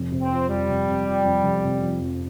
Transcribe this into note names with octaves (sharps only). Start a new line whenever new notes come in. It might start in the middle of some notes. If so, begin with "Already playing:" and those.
Already playing: F1
C3
C4
F3
F2 G3
F1
C3
F3
F2
F1
C3
F3
F2